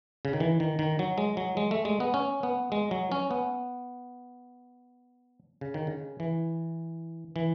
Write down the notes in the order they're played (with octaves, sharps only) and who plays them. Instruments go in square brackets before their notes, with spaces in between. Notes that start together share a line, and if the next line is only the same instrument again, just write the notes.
[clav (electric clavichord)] C#3
D#3
E3
D#3
D#3
F#3
G#3
F#3
G#3
A3
G#3
B3
C#4
B3
G#3
F#3
C#4
B3
C#3
D#3
C#3
E3
E3